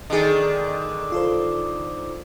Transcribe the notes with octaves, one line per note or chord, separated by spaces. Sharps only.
D3 D#3 G#4 D#5
F4 A4 C5